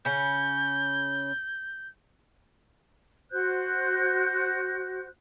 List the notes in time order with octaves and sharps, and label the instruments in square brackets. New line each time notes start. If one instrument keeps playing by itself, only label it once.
[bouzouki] C#3 C#4 [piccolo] G6
[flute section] F#4 C5 F#6 G6